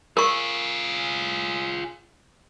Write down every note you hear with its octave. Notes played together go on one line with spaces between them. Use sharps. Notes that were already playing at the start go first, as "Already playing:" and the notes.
F4 G#4 A#4 C#6